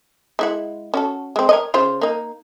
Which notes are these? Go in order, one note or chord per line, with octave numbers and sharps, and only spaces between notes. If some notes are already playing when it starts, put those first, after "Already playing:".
G#3 E4 F#5
C#4 F#4 A4
G#3 C4
A#4 C#5 D#5
C#3 F4 C5
A#3 D#4